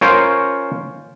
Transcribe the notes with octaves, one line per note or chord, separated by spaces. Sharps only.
C#4 F4 A#4 C5